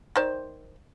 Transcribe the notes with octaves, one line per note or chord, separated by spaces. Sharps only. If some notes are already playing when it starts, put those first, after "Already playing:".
D#3 C5 D5